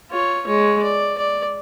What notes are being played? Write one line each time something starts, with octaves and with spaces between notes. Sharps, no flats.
F4 C#5
G#3 C#5
D5
D5